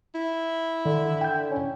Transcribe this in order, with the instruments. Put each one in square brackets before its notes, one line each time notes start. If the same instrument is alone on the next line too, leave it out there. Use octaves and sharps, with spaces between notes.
[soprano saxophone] E4
[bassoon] D3 [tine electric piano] D#3
[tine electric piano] G5 G6
[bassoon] C#4